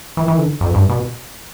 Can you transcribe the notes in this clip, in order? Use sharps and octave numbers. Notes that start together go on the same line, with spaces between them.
E3
E3
D3
F2
G2
B2